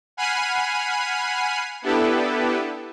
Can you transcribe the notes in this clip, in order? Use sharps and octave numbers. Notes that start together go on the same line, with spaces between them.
F#5 G#5 B5 F6 C7 D#7
B3 D4 E4 G4 A4 B4